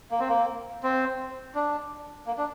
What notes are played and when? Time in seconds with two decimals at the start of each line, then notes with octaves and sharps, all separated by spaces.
0.11 A#3
0.20 C4
0.29 A#3
0.83 C4
1.55 D4
2.27 A#3
2.38 D4